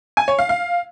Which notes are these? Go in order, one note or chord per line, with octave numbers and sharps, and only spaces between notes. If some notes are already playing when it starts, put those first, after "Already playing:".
G#5
C#5
F5
F5